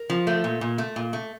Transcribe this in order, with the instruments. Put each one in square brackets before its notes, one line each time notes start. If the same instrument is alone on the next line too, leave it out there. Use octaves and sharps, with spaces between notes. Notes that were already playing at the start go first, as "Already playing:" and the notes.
Already playing: [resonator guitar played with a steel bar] A#4
F3
A3
A#2
A#2
A3
A#2
A3